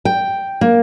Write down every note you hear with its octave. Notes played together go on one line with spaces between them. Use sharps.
G5
A#3